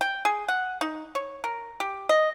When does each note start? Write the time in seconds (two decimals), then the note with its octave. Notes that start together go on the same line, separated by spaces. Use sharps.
0.01 G5
0.25 G#4
0.48 F#5
0.81 D#4
1.15 C#5
1.44 A#4
1.80 G4
2.09 D#5